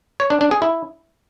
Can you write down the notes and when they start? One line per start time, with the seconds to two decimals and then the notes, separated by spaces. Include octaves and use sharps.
0.20 C#5
0.30 D4
0.41 D4
0.51 G#4
0.62 E4